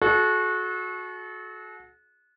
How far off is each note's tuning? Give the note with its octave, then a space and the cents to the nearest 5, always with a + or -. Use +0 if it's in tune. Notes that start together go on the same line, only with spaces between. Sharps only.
F#4 -20 A4 -40